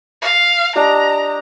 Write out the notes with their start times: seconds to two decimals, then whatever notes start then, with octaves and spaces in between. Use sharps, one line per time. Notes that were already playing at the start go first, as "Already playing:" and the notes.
0.22 F5
0.76 D4 G4 D#5 A#5